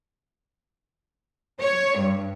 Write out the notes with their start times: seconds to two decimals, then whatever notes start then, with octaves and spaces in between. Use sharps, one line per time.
1.60 C#5
1.98 G2